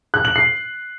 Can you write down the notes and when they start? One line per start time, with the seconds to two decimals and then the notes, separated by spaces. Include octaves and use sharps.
0.14 F#6
0.25 F#7
0.36 C7